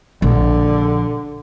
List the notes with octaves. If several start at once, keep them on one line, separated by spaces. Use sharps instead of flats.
A#1 D3